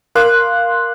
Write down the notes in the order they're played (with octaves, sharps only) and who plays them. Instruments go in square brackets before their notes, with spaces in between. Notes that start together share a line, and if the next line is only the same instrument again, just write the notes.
[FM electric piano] A#4 F5 C6 D6 F#6